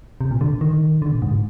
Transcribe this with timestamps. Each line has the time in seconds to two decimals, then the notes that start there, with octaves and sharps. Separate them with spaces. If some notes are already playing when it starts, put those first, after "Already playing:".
0.21 C3
0.31 A#2
0.41 D3
0.61 D#3
1.02 D3
1.12 A#2
1.22 G#2